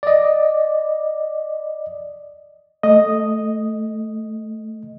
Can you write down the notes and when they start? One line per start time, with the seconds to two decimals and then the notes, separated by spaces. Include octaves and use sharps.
0.03 D5 D#5
2.83 A3 D#5